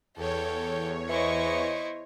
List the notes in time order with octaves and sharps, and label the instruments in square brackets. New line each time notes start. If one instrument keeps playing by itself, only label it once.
[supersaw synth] E2 C#5 [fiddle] A4 G5
[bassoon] E3 [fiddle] E4 C5 [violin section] D#5 C#6